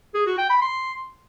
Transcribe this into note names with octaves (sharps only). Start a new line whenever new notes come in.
G#4
F#4
G5
B5
C6